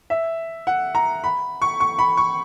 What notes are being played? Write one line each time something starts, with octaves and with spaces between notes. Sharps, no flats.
E5
F#5
A#5
B5
C#6
C#6
B5
C#6